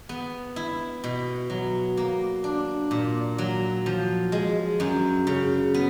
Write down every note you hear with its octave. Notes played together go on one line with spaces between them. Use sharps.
B3
E4
B2
F#3
A#3
D4
A#2
F#3
F3
G#3
F#2
C#3
B3